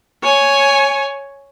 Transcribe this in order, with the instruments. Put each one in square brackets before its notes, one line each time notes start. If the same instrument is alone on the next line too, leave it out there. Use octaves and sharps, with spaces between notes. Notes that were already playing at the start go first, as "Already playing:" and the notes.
[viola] C#5 G#5